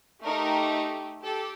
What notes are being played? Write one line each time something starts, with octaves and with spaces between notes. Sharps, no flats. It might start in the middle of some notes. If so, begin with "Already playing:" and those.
A3 D#4 G4 A#4
G4 A4